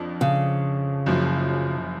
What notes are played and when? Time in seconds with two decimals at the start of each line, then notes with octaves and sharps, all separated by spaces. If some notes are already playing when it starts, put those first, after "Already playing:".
Already playing: F2 F3 D4
0.21 C#3
1.06 F#1 F#2 F3